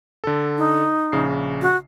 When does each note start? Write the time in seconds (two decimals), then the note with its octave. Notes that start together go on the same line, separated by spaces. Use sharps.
0.24 D3 A4
0.58 D#4
1.12 A#1 C#3 C7
1.62 F#4